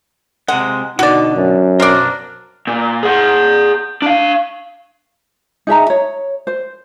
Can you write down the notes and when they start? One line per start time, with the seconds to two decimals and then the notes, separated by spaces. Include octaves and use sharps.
0.48 C3 G#3 F#5
0.99 B2 D3 D#4 F#4 D5
1.36 F#2
1.80 B1 D4 A#4 C5 D5
2.67 A#2
3.03 G#4 F#5
4.02 D4 F5
5.67 D#4 G#4 E5 A#5
5.90 C#5
6.47 C5